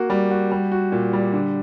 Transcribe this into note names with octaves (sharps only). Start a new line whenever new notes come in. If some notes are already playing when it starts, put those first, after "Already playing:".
Already playing: A#3 F#4
G3
F#4
G3
F#4
A#2
G3
D3